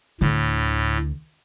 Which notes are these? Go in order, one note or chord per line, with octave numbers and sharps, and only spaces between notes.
D2 A2 D3